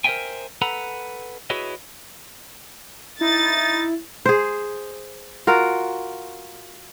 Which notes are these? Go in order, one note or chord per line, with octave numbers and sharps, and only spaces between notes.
A#4 C5 D5 E5 G5 G#5
A4 B4 F#5 A#5 B5
E4 F#4 G#4 B4 C#5 D#5
D#4 E4 A6
G#4 C5
F4 F#4 A#4